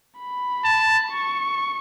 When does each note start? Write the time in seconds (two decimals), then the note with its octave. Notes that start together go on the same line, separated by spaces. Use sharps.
0.18 B5
0.65 A5
1.11 C#6